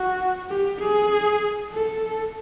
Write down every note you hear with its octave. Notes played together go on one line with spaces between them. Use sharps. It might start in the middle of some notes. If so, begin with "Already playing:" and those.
Already playing: F#4
G4
G#4
A4